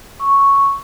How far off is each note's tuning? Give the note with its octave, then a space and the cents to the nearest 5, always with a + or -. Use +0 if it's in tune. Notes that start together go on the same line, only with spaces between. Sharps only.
C#6 +0 E6 +0